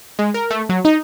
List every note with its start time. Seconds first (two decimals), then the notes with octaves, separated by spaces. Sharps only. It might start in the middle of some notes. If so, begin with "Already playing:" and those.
0.19 G#3
0.34 A#4
0.51 A3
0.69 F#3
0.85 D#4